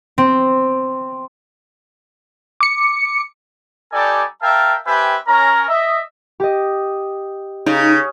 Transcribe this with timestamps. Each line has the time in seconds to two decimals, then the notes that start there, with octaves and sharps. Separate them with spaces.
0.18 C4
2.61 D6 C#7
3.92 G3 D#4 G4 A4 D5 G#5
4.42 A#4 E5 F5 G5 A5
4.85 C4 G4 B4 E5 G5 G#5
5.27 C#4 A#4 A#5
5.68 D#5 E5
6.40 G4 D#5
7.66 C#3 D#4